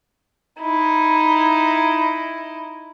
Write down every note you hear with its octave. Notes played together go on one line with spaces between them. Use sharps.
D#4 E4